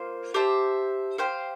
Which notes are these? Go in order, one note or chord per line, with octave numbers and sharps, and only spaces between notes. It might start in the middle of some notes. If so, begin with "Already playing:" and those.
Already playing: A#3 F4 C5 F5
G4 C5 E5 A5
G4 C5 F5